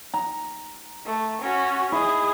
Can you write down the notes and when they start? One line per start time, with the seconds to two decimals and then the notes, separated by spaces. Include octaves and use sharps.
0.14 A#5
1.06 A3
1.42 C#4 F#4
1.92 E4 G#4 D#5